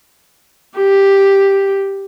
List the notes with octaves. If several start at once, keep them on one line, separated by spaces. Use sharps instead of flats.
G4